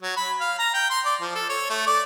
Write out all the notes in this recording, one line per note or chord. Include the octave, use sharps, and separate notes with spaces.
F#3
B5
F5
A#5
G5
C6
D5
F3
A4
C#5
A3
D5